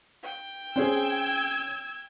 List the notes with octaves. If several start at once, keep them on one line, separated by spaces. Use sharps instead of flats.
G5
C4 C#4 G#4 E6 G#6